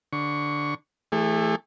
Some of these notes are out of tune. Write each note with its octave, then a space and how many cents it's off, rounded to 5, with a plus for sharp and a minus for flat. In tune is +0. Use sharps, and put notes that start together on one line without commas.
D3 +0 C#6 +10
E3 +0 A3 +0 G#4 -40